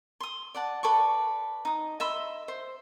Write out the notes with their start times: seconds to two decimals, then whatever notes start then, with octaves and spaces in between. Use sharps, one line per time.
0.20 C6 D#6
0.55 D5 F#5 A5
0.83 A4 B4 D5 C#6
1.65 D#4 D#6
2.00 D#5 E5 B5 C6
2.48 C5